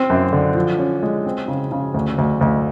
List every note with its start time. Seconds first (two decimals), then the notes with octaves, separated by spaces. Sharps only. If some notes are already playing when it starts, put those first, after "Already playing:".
Already playing: C4
0.10 F#2
0.33 D3
0.55 F3
0.79 C#4
1.03 G#3
1.26 C4
1.48 C#3
1.72 C#3
1.94 D2
2.18 D2
2.41 D2